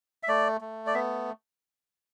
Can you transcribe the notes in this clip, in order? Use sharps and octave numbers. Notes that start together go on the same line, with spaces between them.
E5
A3 D5
A3
D5
B3 E5